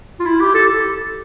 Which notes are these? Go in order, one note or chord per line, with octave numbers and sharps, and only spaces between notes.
F4
E4
G4
A4